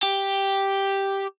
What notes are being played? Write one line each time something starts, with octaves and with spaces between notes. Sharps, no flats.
G4